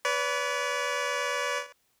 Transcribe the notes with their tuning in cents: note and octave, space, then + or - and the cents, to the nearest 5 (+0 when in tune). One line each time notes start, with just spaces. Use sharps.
B4 +0 D5 -45